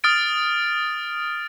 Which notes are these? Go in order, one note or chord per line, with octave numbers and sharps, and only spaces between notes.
D#6 F6 A6 D7